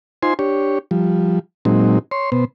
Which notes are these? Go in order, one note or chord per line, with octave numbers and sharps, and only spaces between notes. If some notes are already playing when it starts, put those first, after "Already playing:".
D#4 F4 C5 G#5 C6
D4 G4 C#5
F3 G3
A#2 F#3 G#3 C4 D#4
C#5 C6
B2 B3 C5